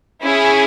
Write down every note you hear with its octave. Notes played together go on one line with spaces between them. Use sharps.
C#4 E4 G#4